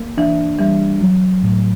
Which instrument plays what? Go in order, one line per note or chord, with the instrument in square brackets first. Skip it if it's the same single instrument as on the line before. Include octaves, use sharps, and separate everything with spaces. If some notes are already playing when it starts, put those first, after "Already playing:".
Already playing: [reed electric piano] A#3
[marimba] E3 [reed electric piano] D4
[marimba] E3 [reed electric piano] G3
[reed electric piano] F#3
A2